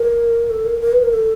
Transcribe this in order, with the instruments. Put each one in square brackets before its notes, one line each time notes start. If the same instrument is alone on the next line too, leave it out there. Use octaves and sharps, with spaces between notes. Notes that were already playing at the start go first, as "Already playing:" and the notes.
Already playing: [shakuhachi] A#4
A4
A#4
A#4
B4
A#4
A4